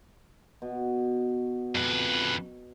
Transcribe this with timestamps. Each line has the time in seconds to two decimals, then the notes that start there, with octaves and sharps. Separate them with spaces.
0.62 B2
1.75 F2 B4